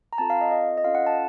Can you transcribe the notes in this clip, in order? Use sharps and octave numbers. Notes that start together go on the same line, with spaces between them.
A#5
C4 F4 A4 A5
F5
D#5
D#5
D#5
C#4 F4 A4 F5
F#5
A5